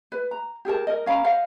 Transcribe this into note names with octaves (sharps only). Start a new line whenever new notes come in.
B4
A#5
G4 G#4 A#4 A5
A#4 D#5
C#4 F5 A#5 B5
C5 D#5 F5 F#5